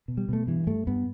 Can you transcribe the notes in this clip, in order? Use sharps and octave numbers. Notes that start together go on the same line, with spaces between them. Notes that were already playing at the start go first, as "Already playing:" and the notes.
B2
G3
B2 A3
G2 E3
G2 A3
G2 B3